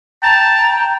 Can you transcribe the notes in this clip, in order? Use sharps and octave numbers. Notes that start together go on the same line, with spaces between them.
G5 A5 A#5